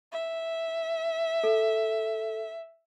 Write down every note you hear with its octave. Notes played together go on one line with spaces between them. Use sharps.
E5
A4